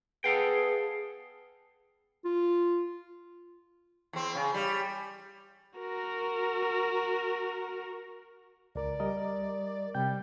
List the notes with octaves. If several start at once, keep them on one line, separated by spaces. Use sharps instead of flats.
B3 G#4 A4 F5 G5
F4
E2 C4
C#3
G3
F#4 A#4
C#2 A#4 D5
G3 A#4 D#5
C3 G3 G5 G6